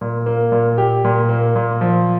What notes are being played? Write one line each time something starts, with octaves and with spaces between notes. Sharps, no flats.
A#2
A#3
A#2
G4
A#2
A#3
A#2
F3